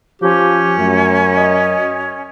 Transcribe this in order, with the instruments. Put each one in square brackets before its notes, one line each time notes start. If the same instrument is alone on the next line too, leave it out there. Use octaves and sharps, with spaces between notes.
[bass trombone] F3 [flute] C#4 [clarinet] G4
[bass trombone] F#2 [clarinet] A3
[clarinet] D#5